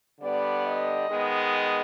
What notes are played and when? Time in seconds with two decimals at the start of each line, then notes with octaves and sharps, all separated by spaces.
0.20 D3 G3 B3 D5
0.64 D#5
1.09 D#3 G#3 B3